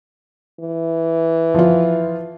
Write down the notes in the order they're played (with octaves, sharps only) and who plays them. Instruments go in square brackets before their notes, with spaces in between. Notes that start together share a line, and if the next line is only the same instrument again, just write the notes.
[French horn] E3
[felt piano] F3 F4